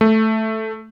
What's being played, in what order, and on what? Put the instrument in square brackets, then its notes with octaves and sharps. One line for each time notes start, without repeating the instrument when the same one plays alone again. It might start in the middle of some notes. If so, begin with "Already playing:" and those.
[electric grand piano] A3